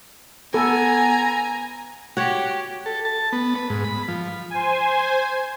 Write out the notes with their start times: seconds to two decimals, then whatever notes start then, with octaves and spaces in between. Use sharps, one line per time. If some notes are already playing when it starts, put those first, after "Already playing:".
0.54 B3 A4 G#5 A#5
2.17 F#4 G4 C#5
2.86 A4
3.05 A5
3.33 B3
3.55 B4
3.70 G#2
3.84 B5
4.08 F3
4.50 C5 G#5